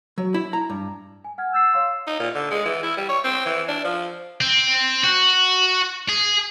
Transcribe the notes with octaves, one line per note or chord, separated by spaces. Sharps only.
F#3
E4
A#5
G2
G#5
F#5 F6 G#6
E6 G6 A6 C7
C#5 F5 C6
D#4
A#2
D3
G#3
E3
E4
G3
C#5
C4
E3
D4
F3
C4
F#4
G#4